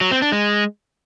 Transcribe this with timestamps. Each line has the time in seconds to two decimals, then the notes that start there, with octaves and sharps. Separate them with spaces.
0.01 F#3
0.11 C4
0.22 D4
0.32 G#3